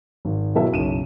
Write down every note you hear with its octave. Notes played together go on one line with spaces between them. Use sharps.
G#1
B2 F#3 E4 A#4 E5
F#1 B1 D#7 E7